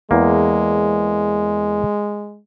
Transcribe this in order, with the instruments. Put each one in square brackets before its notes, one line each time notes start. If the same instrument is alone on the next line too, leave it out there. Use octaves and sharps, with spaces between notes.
[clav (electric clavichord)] E2 A#3 [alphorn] G#3